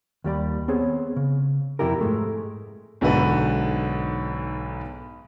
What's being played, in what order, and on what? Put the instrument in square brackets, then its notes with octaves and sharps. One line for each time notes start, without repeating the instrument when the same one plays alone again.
[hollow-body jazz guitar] D#2 G3 D5 B5
B3 C4 G#4 C#5
C#3
F2 C3 E4 G4 A#4
G#2 G#3 A3
[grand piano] B1 G#2 D3 F#4 B4